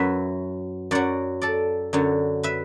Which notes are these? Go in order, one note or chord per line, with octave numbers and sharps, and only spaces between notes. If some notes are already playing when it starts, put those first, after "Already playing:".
Already playing: F#2 F#3 B4 E5
F#2 F#3 D5 F#5
A4 D5
F#2 D3 F#3
B4 E5